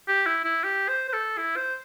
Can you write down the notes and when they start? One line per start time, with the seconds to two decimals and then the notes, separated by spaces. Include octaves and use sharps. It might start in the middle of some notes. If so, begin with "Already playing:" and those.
0.08 G4
0.26 E4
0.45 E4
0.64 G4
0.88 C5
1.09 C5
1.13 A4
1.38 E4
1.56 C5